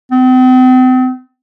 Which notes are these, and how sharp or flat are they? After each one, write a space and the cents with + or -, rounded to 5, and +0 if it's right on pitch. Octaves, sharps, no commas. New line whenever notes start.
C4 -40